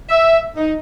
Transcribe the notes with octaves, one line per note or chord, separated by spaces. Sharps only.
E5
D#4